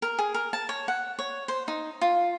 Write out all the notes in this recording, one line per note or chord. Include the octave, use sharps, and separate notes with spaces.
A#4
G#4
A#4
A5
C#5
F#5
C#5
C5
D#4
F4